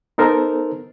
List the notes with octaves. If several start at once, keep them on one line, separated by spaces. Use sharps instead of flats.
B3 D#4 A4 A#4 C5